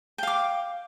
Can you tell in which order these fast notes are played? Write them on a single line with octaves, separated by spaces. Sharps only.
G5 F5 D6